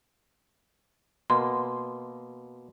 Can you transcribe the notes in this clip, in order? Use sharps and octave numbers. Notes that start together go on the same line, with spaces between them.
B2 A#3 C6